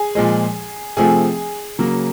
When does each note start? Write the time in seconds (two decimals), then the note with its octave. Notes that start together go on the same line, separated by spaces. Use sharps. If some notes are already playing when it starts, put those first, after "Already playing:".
Already playing: G#4 G#5
0.15 A#2 F3 G#3
0.97 C3 F3 A3 G#4 G#5
1.79 C#3 F#3 A#3